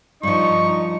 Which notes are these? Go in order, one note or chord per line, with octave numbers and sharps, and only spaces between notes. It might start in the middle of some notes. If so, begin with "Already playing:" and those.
G2 F3 D#4 C#6